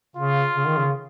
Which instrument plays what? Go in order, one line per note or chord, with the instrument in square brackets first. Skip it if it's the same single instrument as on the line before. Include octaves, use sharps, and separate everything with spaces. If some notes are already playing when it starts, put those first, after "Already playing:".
[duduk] C#3 [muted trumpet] F4
[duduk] C#3
D#3
C#3